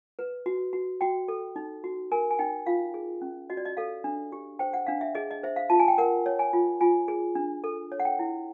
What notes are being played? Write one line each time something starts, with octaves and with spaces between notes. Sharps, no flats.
B4
F#4
F#4
F#4 G5
A4
D#4
F#4
A#4 G#5
G#5
D#4 G5
F4 F5
G#4
C#4
F#4 D#5
D5
D#5
A4 F5
D4
G4
C5 G5
F#5
D4 F5
E5
G#4 D#5
D#5
C5 E5
F5
F4 A5
G#5
G5
A#4 F#5
C#5
G#5
F4
F4 G#5
G#4
D4
A4
C#5
F#5
G5
E4